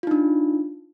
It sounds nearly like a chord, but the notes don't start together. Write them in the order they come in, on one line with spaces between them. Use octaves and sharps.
F4 D#4 D4